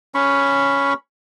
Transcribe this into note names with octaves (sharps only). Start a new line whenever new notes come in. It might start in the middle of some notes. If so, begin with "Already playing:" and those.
C#4 B5 C#6